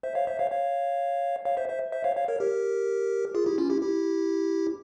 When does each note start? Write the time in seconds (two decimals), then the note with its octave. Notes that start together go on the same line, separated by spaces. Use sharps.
0.03 C5 E5
0.15 C#5 F5
0.27 C5 E5
0.39 C#5 F5
0.51 C#5 F5
1.45 C#5 F5
1.57 C5 E5
1.69 C5 E5
1.92 C5 E5
2.04 C#5 F5
2.16 C#5 F5
2.28 A#4 C#5
2.40 G4 A#4
3.35 F4 G#4
3.46 E4 G4
3.58 C#4 F4
3.70 E4 G4
3.81 E4 G4